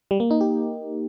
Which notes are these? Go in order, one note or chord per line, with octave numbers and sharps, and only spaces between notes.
G3
A#3
D#4
G4